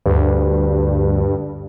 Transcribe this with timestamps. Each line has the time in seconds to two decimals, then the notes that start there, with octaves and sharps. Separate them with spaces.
0.06 D2 G2